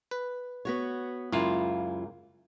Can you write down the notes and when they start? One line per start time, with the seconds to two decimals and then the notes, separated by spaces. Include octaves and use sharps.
0.11 B4
0.65 B3 F#4 C#5
1.32 C#2 F#2 A#3 E4 F4